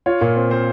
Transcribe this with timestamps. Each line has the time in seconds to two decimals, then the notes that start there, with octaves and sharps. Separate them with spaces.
0.06 F4 C#5
0.21 A#2
0.36 C4
0.50 C4 C5